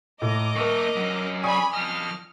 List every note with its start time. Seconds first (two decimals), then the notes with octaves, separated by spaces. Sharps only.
0.22 A2 D#5 A#5 D6
0.56 A#3 A#4 E5 C#6
0.96 F#3 C#4
1.43 D5 G#5 B5 C#6 D#6
1.73 F3 D#5 F6